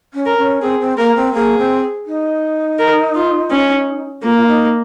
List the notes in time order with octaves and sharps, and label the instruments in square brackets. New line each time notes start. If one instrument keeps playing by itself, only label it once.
[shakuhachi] C#4
[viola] A#4
[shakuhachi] C#4
[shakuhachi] C4 [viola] G#4
[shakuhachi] C4
[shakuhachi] A#3 [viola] A#4
[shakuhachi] C4
[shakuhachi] A#3 [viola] G#4
[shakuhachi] C4
D#4
[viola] A#4
F4
C#4
[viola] A#3 [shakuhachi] F4
[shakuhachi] F4
D#4